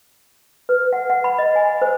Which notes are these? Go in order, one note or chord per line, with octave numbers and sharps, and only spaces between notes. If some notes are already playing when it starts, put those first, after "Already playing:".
B4
F#5
F#5
B5
D#5
G#5
C5